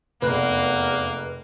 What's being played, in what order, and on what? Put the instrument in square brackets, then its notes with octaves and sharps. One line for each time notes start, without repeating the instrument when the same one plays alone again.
[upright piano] F1 [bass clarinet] E2 [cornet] A#3 [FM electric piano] B4 F#6